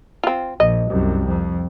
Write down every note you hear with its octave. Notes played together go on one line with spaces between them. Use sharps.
C4 F4
A#1 D#5
C2 F#2
F2